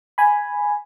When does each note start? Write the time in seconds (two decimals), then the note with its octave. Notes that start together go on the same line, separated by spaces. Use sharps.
0.18 G#5 B5